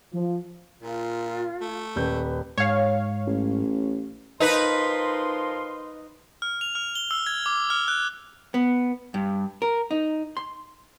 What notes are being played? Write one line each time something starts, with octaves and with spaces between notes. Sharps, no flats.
F3
A#2 F4
A3
D#1 B4 G6
G#2 C#5 F5
A1
F3 D#4 A#4 B4 C6
F6
F7
F6
G7
E6
G#6
D6
F6
F#6
B3
G2
A#4
D#4
C6